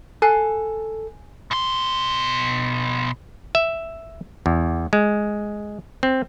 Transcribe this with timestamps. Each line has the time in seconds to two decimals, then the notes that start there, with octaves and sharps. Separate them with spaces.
0.22 A4 G#5 F#6 C7
1.51 B2 C6
3.55 E5
4.46 E2
4.93 G#3
6.03 C4